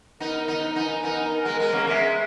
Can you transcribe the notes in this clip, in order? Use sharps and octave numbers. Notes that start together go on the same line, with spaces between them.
B3 D#4 A#4
B3 D#4 A#4
B3 D#4 G#5
B3 D#4 A#4
A#4
G#3 B3
G#3 B3 A#4
A#3 C#4
G#3 B3 E5